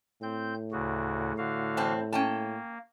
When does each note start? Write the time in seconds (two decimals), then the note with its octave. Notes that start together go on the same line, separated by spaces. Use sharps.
0.22 A2 C4 G6
0.72 D2 C#3 F#4
1.38 D3 F#4 F5
1.77 E2 C4 A5
2.13 A#3 C#4 G5 A5